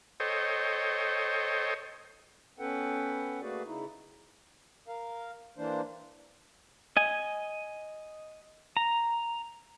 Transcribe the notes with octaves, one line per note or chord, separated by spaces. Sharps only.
A4 C5 C#5 D#5 G5
B3 C#4 A4 B4 F#5 G5
A3 A#3 F#4 G#4 B4 D5
C#3 D#4 E4
A#4 F5
E3 A#3 D4 C5
D#5 G#5
A#5